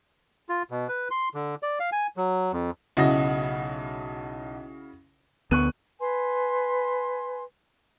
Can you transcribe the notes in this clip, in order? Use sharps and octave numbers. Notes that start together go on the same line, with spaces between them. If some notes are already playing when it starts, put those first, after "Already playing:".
F4
B2
B4
C6
D3
D5
F5
G#5
F#3
F2
B1 C#3 E4 F#4 D#5 A#6
D2 B3 C#6 F#6 D#7
B4 G#5 C6